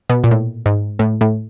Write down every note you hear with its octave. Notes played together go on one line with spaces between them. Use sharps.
B2
A#2
A2
G#2
A2
A2